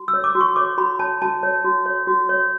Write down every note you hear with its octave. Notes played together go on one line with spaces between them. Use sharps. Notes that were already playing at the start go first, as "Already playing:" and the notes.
Already playing: F#4
E6
C#5
D6
F#4
C#6
C#5 D6
F#4 B5
C#5 A5
F#4 A5
C#5
F#4
C#5
F#4
C#5